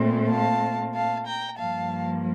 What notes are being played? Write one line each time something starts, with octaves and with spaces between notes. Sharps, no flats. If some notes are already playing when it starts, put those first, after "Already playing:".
Already playing: A#2 A3 C4
F5 A5
F5 A5
G5 A#5
G2 F3 A#3 F5 A5